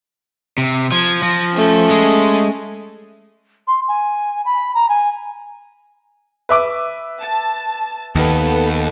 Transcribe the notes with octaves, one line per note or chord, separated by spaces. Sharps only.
C3
F3 G#6
F3 A#6
A3 C#4
G#3
C6
G#5
B5
A#5
G#5
B4 E5 D6
A5
D#2 B3 A4